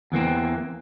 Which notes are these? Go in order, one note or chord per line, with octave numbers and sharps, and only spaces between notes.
E2 E3 A#3 C4